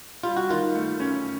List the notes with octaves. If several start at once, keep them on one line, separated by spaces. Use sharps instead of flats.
G3 F4
F#4
D#3 F4
A3
C#4